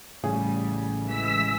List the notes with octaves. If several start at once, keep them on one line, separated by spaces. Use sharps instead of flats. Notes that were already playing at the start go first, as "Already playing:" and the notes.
A1 A2 C#3 G3 G#4
E3 G#3 E6 B6